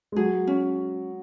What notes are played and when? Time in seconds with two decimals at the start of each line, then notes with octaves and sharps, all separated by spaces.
0.12 G#3
0.16 F#3 G#4
0.47 C#4